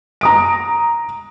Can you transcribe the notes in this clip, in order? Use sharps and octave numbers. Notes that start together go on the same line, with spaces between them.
A#5 D#6 D7